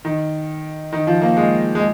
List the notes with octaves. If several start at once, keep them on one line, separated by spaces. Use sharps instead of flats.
D#3
D#3
F3
A#3
G#3
G#3